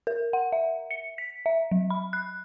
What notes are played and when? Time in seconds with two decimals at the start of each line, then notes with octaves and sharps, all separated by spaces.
0.07 A#4
0.33 F#5
0.52 E5
0.91 C#7
1.18 B6
1.46 E5
1.71 F#3
1.90 B5
2.13 F#6